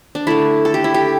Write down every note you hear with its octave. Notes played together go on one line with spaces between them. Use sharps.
D4
D3 A3 E4
A4
G4
E4
G4